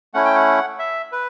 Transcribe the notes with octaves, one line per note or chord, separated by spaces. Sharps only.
A3 C#4 E4 F#5
G5
F#5
E5
B4